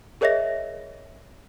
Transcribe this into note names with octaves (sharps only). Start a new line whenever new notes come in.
G#4 A#4 C#5 D#5 E5 A#6